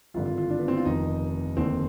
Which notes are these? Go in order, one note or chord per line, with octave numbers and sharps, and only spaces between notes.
G#1 G2 D3 F4
F4
F4
D4
B3
C4
F4
F1 F2 D#3 D#4
F1 D#2 D3 C4